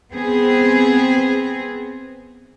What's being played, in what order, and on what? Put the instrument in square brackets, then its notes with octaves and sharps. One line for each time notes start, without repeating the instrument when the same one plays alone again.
[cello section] B3 C4 G#4